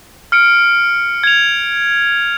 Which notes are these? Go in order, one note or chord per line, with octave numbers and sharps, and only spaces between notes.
F6 C#7 D7
G#6 F7